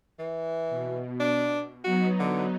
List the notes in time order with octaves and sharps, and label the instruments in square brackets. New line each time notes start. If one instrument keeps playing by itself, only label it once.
[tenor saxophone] E3
[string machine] B2
[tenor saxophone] D4
[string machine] F#3 B3 D#4 [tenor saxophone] F#4
[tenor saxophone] D3